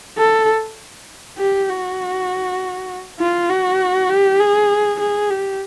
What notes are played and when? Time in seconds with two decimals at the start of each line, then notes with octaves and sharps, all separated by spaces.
0.18 A4
1.38 G4
1.69 F#4
3.20 F4
3.49 F#4
4.09 G4
4.40 G#4
5.00 G#4
5.30 G4